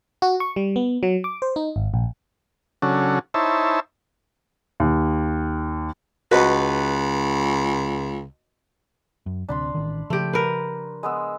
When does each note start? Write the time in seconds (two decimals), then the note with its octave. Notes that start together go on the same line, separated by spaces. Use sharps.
0.22 F#4
0.40 C#6
0.56 G3
0.76 B3
1.03 F#3
1.24 D6
1.42 C5
1.56 D#4
1.76 G#1
1.94 A#1
2.82 C#3 F#3 C#4 D4 F#4 A4
3.34 D#4 E4 C5 C#5 E5 A5
4.80 D#2
6.31 C#2 F#4 B4 D#5
9.26 F#2
9.49 D1 D2 C3 D4 B5 C6
9.75 A1 D#3
10.10 C#3 F3 A3 G4
10.33 A#4 B4
11.03 G#3 B3 E6